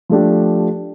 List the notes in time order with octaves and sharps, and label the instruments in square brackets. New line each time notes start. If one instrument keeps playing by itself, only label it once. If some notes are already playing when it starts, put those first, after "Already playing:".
[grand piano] F3 A3 D4 G4